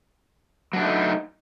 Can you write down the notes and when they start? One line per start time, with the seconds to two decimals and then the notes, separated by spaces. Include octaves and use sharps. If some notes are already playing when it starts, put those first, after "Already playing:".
0.73 F#3
0.76 D4
0.80 A3
0.83 D#4